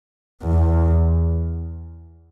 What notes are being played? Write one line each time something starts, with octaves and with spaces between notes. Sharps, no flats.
E2